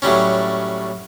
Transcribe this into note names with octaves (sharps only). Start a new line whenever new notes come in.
A2 F#3 G3 C#4